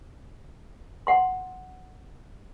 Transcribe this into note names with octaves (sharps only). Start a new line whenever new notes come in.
F#5 C6